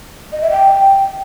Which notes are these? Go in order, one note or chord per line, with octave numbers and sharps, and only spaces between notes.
D#5
E5
G5